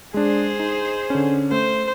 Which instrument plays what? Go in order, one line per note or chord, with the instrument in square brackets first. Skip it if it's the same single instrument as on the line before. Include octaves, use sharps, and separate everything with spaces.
[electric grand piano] G#3 D4 [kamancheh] G#4 C5
[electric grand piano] D#4
D3 C#4
[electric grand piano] A3 [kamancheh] C5